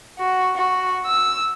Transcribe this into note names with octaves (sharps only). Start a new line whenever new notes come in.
F#4
F#4
E6